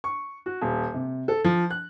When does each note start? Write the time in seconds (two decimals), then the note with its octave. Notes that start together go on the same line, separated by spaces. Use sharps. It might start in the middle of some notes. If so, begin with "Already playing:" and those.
0.04 C#6
0.46 F#4
0.62 D#1
0.94 C3
1.28 A4
1.44 F3
1.70 F#6